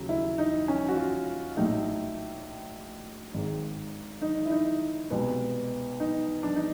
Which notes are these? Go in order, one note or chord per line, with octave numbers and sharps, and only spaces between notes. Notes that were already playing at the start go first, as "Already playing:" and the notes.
Already playing: D#2 C#3 F#3
E4
D#4
C#4
F#4
F4
A#1 A2 F#3 A3 D#4
G#1 G#2 D#3
D#4
E4
D#4
C2 B2 G#3 B3
D#4
D4
D#4